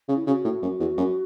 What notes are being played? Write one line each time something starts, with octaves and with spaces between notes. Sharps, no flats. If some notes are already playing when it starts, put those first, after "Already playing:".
C#3
E4
C#3 F#4
A2
F#2
E2
F#2